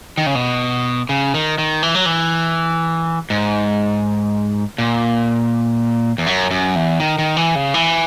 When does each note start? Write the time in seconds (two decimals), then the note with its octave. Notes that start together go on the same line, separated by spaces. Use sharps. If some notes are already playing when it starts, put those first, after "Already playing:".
0.18 D#3
0.26 C#3
0.35 B2
1.09 C#3
1.34 D#3
1.58 D#3
1.83 E3
1.95 F#3
2.06 E3
3.30 G#2
4.78 A#2
6.18 E2
6.26 F#2
6.50 F#2
6.76 E2
7.00 D#3
7.18 D#3
7.37 E3
7.55 C#3
7.74 E3